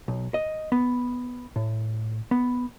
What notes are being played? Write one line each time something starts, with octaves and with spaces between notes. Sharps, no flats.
B1
D#5
B3
A2
B3